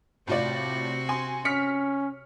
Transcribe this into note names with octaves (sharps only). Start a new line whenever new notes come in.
A2 C3 C4 F4 F#4 D5
G#5 C6
C#4 F6 B6 C#7